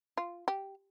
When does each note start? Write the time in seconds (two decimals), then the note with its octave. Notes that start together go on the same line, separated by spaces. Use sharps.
0.17 F4
0.48 G4